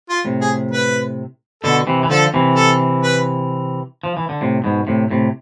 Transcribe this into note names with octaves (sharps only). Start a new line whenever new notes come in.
F4
A2 C3
G#4
B4
B2 D3 A4
C3 E3
E3
D3 F3 A4
C3 E3
A4
B4
F3
E3
D3
A2 C3
G#2 B2
A2 C3
A2 C3